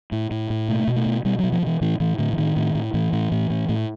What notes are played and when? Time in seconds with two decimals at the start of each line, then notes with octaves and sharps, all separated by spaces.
0.12 A2
0.31 A2
0.50 A2
0.68 B2 A3
0.88 B2
0.96 A3
1.06 B2
1.24 B2 G3
1.39 B2 F#3
1.52 F3
1.62 B2 E3
1.81 A2 E3
2.00 A2 E3
2.18 A2 D3
2.33 E3
2.37 A2 D#3
2.56 A2
2.75 A2
2.94 A2 E3
3.13 A2
3.32 A2
3.50 A2
3.69 A2